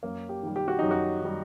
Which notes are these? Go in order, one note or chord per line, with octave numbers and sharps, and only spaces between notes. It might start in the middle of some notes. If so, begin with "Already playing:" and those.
F#2 A#3
G4
D#3 G3
G4
F#4
F#2 D#4
F#4
D#3 G3